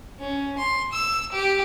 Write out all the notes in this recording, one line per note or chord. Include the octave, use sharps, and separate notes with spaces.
C#4
C6
E6
G4